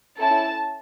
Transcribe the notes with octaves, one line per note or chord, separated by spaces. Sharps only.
C#4 E4 A4 A5